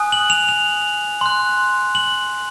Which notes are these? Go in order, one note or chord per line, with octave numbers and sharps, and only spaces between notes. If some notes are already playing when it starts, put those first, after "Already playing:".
Already playing: G#5 D#6 F#6
F#7
F7
F7
C6 F#6
F#7